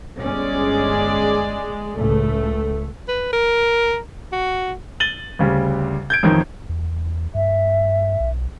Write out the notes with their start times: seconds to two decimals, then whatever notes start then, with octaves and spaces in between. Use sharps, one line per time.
0.19 G1 G#3 C#4 G#4 D5
1.96 C#2 A2 C#3 A3
3.08 B4
3.33 A#4
4.32 F#4
5.00 A6 D#7 F#7 G7
5.39 D2 C#3 G3
6.10 G6 G#6 D7
6.23 A1 F2 D#3
6.69 E2
7.35 G2 E5
8.20 B1